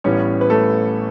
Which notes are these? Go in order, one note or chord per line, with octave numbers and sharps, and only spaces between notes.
A1 A2 G3 B3 C#4 C#5
B4
A3 A4